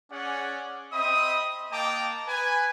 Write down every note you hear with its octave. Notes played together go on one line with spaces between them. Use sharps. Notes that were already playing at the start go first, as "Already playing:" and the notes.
C#4 G#4 D5 F#5
C4 D#5 E5 B5 D#6
A#3 D#5 G5 A5 A#5 D6
B4 G#5